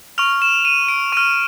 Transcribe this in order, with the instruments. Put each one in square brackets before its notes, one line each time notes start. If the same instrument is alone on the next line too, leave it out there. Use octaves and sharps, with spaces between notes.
[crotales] C#6 F6 F7
E7
D#7
D7
C#6 F6 D#7